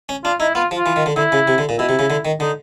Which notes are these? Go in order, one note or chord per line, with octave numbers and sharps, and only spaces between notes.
C#4
D4 F4
D#4 E4
B3 F4
F3
F4
E3
D#3
D3
D3 E4
C#3
C3
D3
A#2
B2 E4
C3
C#3
D3
D#3
D3 D#4